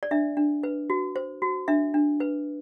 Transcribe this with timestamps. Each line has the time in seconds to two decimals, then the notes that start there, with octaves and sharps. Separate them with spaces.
0.03 D5
0.11 D4 E5
0.37 D4
0.63 B4
0.90 F#4
1.16 C5
1.42 F#4
1.68 D4 E5
1.94 D4
2.20 B4